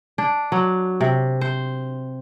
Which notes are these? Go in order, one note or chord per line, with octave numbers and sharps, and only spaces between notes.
D4
F#3
C3
C5